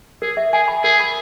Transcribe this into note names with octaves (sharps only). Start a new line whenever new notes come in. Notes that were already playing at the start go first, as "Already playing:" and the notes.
G#4 A#4
E5
G#4 G#5
B5
G#4 A#4
B5